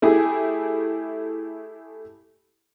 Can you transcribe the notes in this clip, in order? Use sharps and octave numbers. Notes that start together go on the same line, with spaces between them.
A3 E4 G4 G#4